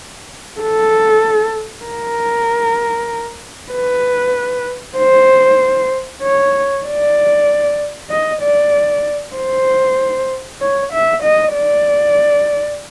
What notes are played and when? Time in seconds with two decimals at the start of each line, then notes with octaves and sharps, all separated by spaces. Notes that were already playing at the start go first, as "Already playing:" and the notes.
0.61 A4
1.86 A#4
3.73 B4
4.98 C5
6.23 C#5
6.86 D5
8.10 D#5
8.42 D5
9.36 C5
10.61 C#5
10.93 E5
11.23 D#5
11.55 D5